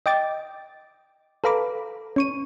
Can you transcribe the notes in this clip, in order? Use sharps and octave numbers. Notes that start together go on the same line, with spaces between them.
D#5 G5 D6 A6
A4 B4 F5 A#5 B5 D6
C#4 C#6 D#7